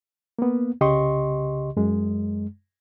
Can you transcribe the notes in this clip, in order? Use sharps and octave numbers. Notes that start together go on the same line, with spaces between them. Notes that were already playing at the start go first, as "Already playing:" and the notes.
A#3 B3
C2 C#3 G4 D#5 C6 C#6
F#2 G#3